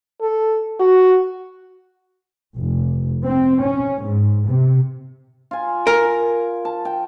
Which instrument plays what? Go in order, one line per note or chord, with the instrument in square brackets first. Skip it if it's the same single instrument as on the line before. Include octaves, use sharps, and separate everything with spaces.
[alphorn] A4
F#4
[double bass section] F1
C4
C#4
G#2
C3
[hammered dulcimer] F4 G#5
[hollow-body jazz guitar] A#4 [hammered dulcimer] G#5
[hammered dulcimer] A5
G5